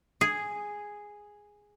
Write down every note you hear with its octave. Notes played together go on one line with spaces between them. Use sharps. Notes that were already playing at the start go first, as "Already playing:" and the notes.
G#4